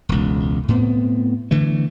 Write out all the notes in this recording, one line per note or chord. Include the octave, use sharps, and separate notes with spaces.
E1 C#2
A2 B3 C4
D3 E3 A3